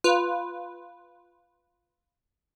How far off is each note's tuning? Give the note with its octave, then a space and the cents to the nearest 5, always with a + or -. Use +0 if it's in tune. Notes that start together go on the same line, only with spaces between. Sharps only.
F4 +0 B4 +0